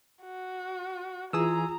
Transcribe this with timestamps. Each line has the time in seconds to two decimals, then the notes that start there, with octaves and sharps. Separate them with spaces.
0.24 F#4
1.33 E3 F4 G#4 G#5 A#5 D#6 E6